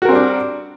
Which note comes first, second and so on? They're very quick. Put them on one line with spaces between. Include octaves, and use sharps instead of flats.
F#4 A#4 C4 G3 D4